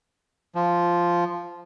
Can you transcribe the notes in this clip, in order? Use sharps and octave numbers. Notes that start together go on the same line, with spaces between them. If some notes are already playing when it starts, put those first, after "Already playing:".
F3